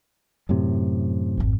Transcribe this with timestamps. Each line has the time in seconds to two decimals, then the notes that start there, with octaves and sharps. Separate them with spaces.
0.49 F#2 A2 C3
1.37 G#1 F2